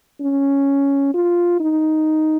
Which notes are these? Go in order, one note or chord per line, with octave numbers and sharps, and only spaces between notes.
C#4
F4
D#4